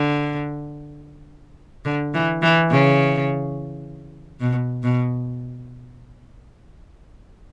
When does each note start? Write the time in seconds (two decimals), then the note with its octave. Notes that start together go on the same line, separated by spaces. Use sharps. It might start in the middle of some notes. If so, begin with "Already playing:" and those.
Already playing: D3
1.85 D3
2.14 E3
2.42 E3
2.70 C#3
4.40 B2
4.83 B2